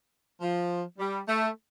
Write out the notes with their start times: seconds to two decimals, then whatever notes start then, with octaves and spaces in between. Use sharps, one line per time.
0.40 F3
0.99 G3
1.27 A3